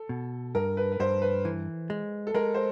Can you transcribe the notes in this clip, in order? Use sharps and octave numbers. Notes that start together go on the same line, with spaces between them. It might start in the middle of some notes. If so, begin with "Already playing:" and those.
Already playing: A4
B2
G2 A#4
B4
B4
G2 C5
B4
E3
G#3
A4
G#3 A#4
C5